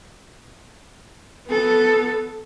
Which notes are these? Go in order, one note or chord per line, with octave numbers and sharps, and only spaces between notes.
B3 A4